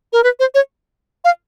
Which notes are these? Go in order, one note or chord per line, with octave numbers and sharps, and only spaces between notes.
A#4
B4
C5
C#5
F5